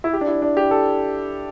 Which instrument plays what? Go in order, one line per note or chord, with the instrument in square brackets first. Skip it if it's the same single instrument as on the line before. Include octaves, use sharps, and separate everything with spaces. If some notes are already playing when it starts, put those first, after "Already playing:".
[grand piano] E4
G4
D4
E4
D4
G4
A4